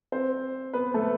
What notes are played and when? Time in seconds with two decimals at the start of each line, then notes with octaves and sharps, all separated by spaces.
0.12 C4 C5
0.74 B3 B4
0.94 A3 A4